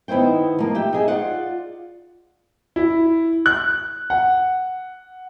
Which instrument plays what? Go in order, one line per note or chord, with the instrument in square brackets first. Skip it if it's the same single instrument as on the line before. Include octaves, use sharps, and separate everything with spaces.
[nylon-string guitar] D#3 B3 E4 C5 G5
F3 A#3
G4 E5 G5
D#4 G#4 E5
F4 D5 F5 F#5
[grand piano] E4
F#6
F#5